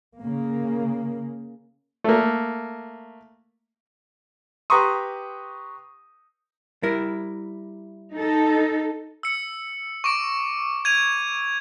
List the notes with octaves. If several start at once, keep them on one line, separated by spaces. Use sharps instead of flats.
C#3 A#3
A3 A#3
G4 B4 A#5 C6 C#6 D#6
G3 E4 A#4
D#4 A4
E6 C#7
C#6 D6 D7
G#6 D#7 F7